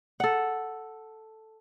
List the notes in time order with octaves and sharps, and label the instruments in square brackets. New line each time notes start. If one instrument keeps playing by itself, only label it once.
[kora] A4 F#5